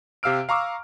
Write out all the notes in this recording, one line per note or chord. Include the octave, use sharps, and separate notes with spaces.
C3 G4 F5 E6 F6 D7
F5 A#5 C#6 D6 E6